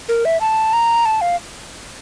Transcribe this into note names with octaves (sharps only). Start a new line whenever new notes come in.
A#4
E5
A5
A#5
A5
F5